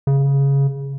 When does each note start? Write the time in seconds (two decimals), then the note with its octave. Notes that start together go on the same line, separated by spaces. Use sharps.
0.07 C#3